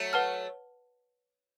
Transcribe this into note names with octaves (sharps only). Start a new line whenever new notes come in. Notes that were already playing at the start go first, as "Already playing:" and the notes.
Already playing: F#3 A3
B4 F#5 A5 F6